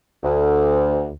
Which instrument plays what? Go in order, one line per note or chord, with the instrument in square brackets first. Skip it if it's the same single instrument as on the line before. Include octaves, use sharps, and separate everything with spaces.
[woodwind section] D2